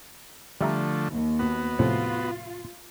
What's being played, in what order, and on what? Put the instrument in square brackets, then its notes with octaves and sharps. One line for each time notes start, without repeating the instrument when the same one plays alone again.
[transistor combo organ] D3 F3 A3 [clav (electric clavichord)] G3 E5 A#5
[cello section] D#2
[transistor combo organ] B3 F#4
[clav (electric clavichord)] A2 C3 F3 [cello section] F4